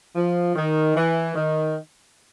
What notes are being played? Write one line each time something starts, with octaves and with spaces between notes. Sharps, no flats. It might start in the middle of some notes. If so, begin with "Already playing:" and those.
F3
D#3
E3
D#3